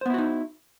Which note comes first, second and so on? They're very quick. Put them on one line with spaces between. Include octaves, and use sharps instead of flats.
C5 B3 E4 F#4 D#4